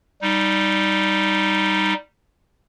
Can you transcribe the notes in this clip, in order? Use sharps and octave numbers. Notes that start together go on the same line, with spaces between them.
G3 D#4